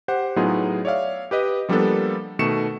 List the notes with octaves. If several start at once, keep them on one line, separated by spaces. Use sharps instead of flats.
G4 C5 F#5
A2 F#3 B3 D#4 F4 G#4
C#5 D5 E5 F5
G4 B4 D#5
F3 G3 A#3 B3 D4 A4
B2 D#3 A3 C#6 C#7 E7